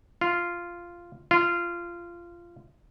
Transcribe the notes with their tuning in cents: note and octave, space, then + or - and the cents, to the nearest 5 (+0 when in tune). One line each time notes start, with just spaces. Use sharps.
F4 -10
F4 -20